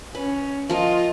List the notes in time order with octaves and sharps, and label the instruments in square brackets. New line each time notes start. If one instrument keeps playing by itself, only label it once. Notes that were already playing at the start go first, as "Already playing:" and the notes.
[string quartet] C#4 [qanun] B4
[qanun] F3 A#4 [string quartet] F4 D#5